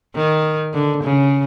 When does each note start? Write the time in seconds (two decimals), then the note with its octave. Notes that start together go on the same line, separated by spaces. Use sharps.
0.15 D#3
0.74 D3
1.03 C#3